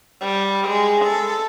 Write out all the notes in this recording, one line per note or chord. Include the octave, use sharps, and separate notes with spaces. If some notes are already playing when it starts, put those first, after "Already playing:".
G3
G#3
A4